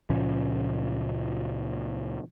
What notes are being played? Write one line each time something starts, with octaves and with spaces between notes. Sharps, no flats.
C#2 A#2 F3 C#4